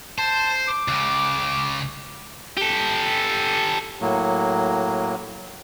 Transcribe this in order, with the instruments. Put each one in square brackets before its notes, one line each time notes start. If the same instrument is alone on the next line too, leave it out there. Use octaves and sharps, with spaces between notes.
[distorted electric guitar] C5 [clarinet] A5
[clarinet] D6
[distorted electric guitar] C#2 C#3
G4 A4
[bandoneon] A2 F#3 A#3